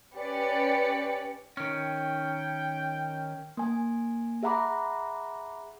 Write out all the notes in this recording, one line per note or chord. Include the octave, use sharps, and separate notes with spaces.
C#4 G4 B4 D5 C#7
D#3 C#4 G5
A#3 G#5
G#4 E5 F#5 A#5 B5 D6